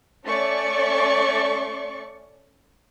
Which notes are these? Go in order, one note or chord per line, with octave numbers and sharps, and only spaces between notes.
A3 C#4 D5 C#6